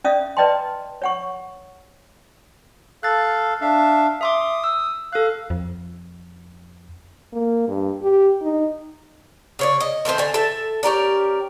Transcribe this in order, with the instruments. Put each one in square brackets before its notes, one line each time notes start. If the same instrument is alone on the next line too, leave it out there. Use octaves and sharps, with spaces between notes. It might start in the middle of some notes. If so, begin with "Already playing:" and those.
[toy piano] C#4 D5 E5 F5 D#6
B4 D5 D#5 G5 A5 C6
C#5 F#5 C#6
[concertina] A4 F5 [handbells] F#6 A6
[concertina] D4 E5 F5
[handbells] E5 C6 D6 [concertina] D#6
[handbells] E6
[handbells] A4 F#6 [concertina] F5
[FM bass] F2
[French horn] A#3
G2
G4
D#4
[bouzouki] C#3 C#5 D5
D#5
D#3 A3 B3 C4
D3 G#5
A4 E5
C#4 G4 A#4 D5